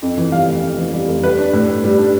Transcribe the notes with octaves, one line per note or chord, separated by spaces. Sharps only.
F2
E3
G3 F5
F1
F2
E3
G3
F1
G3 B4
D4
A2
A2
G3
D4